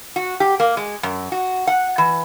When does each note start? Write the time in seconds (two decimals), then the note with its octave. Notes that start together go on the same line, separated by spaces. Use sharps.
0.16 F#4
0.40 G4
0.60 A#3
0.77 G#3
1.03 F#2
1.32 F#4
1.67 F#5
1.98 E3